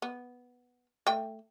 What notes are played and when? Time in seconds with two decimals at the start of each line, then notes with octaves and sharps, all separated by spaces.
0.02 B3
1.07 A3 G5